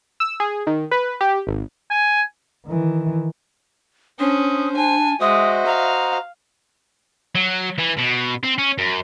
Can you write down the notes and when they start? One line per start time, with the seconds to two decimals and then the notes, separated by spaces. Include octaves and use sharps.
0.20 E6
0.40 G#4
0.67 D#3
0.91 B4
1.21 G4
1.47 G#1
1.91 G#5
2.66 D#3 E3
4.19 C#4 D4 C5 D#6
4.76 G#5 A5
5.21 G#3 F#4 C5 D#5 E5 D#6
5.66 F5 A#5
7.35 F#3
7.79 E3
7.98 B2
8.44 C4
8.58 C#4
8.78 F#2